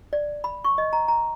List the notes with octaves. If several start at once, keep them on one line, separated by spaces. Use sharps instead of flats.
D5
B5
C#6
D#5
A#5
A#5